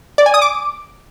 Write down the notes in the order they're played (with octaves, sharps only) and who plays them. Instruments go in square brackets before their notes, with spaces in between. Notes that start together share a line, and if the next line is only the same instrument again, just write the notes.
[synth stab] D5
G#5
D#6
D6